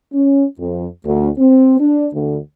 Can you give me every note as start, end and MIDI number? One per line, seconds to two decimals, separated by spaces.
0.13 0.45 61
0.59 0.87 41
1.05 1.28 38
1.38 1.78 60
1.80 2.07 62
2.13 2.38 38